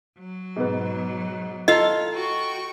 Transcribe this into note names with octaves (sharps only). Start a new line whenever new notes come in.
F#3
G#2 B2 B3
F4 A4 D#5 F5 A#5 E6
F#4 G5 C#6